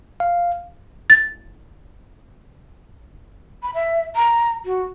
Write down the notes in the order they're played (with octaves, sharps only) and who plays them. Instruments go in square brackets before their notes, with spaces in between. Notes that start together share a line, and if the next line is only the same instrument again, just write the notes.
[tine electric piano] F5
[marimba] A6
[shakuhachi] B5
E5
A#5
F#4